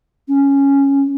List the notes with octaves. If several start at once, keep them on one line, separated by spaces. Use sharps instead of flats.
C#4